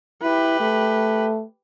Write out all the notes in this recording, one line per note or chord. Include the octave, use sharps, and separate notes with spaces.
E4 G4 B4
A3